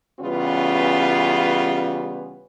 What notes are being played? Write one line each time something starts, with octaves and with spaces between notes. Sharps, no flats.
C#3 E3 G3 B3 C#4 F4